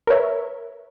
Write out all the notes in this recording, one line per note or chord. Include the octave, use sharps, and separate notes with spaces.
A#4 B4 C#5 E5